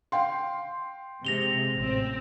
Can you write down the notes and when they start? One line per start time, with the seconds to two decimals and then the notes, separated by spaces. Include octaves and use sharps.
0.12 F5 G5 C6
1.25 C3 G#3 A#6 F7 G7
1.76 A1 C4